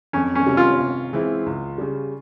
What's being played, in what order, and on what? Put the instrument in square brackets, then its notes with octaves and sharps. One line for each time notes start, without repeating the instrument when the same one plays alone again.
[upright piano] F2 [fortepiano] C#4
[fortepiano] C#4
[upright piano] C3 G3 C#4
[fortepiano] F4
[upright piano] C3
E3 G#3 C4 E4
C#2
C#3 G3